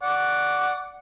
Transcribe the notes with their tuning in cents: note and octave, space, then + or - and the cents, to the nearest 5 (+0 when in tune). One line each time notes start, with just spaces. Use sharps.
D5 +0 F#5 +0 C#6 +25